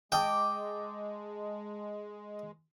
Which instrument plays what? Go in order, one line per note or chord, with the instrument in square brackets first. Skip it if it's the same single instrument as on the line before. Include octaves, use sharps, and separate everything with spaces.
[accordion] G#3 [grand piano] D#5 A5 D#6 [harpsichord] G5 [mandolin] D6